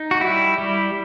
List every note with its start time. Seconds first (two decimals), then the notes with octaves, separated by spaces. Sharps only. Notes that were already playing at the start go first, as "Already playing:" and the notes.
Already playing: D#4
0.11 F#4
0.21 G3 E4
0.58 G3